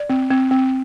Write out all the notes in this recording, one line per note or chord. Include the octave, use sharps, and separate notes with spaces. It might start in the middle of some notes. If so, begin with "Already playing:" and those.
Already playing: D5
C4
C4
C4